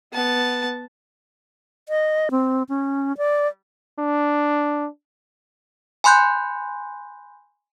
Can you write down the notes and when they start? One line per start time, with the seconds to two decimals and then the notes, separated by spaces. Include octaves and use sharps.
0.13 B3 A5
1.89 D#5
2.31 C4
2.69 C#4
3.17 D5
3.99 D4
6.04 G#5 B5 C6 F#6 G6